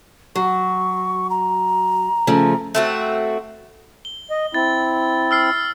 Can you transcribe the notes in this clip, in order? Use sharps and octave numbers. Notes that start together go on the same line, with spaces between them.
F#3 C#6
A#5
C#3 F3 A3
A3 C4 F#4
G7
D#5
C4 E4 A6
E6 F6 C7